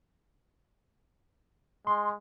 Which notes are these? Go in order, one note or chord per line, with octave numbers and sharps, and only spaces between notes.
G#3 C6